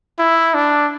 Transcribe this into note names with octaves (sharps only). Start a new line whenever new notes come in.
E4
D4